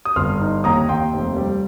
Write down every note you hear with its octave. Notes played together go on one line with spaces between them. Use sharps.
D#6
G1 C6 F6
D#4
D#2 A#5 D#6
D#2 G5 C6
F1
G3